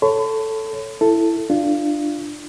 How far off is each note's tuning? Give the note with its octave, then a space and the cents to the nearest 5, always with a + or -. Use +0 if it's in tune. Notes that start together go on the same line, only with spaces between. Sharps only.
A4 +0 C#5 +0 B5 +45
E4 +10 A4 +5
D4 +15 F4 -20